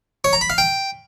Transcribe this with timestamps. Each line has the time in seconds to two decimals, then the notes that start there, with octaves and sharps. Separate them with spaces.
0.24 C#5
0.33 A#5
0.41 B5
0.50 F5
0.58 G5